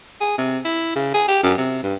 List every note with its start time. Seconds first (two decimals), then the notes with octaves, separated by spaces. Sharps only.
0.21 G#4
0.38 C3
0.65 E4
0.95 C#3
1.14 G#4
1.28 G4
1.43 F#2
1.58 C3
1.83 G2